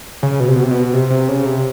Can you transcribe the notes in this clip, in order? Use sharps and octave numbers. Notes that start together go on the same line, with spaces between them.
C#3
B2
C3
B2
C3
B2
C3
C3
C#3
C3